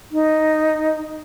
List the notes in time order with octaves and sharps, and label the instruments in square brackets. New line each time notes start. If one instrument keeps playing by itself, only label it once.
[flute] D#4